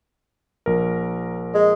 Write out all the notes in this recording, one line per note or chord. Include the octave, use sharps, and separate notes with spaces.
A#1 A#4
G#3